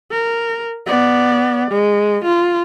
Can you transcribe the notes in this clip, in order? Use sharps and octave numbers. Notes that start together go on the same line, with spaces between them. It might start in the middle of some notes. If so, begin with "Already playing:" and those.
A#4
B3 D5
G#3
F4